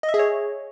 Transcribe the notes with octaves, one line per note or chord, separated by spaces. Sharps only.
D#5
E5
G#4
C#5